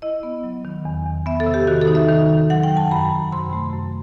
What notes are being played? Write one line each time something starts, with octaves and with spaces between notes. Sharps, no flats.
E4 D#5
B3
F#3
D#3
E2
E2
B3 E5
A4
C3
G4
D#3 F#4
A4
D#4
E5
D#3
D#3
F#3 F#5
G5
F#2
A5
F#2 B5
F#2
C3 C6
A3
F#2